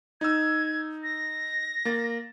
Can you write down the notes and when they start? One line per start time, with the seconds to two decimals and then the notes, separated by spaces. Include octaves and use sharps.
0.21 D#4 E6 G#6
1.03 A#6
1.85 A#3 A6